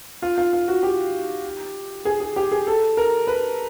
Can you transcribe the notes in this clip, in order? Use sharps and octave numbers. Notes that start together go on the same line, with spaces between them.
F4
F4
F4
F#4
G4
G#4
G#4
G4
G#4
A4
A#4
B4